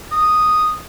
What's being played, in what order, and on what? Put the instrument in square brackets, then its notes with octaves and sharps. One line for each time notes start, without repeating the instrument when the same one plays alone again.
[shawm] D#6